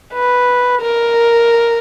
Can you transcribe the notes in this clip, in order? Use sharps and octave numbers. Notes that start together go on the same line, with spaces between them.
B4
A#4